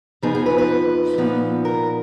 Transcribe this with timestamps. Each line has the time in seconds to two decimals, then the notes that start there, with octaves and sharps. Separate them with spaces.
0.22 F2 F3 B3 D#4 G#4
0.35 G#4
0.46 B4
0.58 B4
1.18 A#2 F3 B3 D#4
1.65 A#4